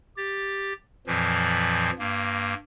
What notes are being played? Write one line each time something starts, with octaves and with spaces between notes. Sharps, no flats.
G4 A6
F2 A#2 E3 F3
G2 A#3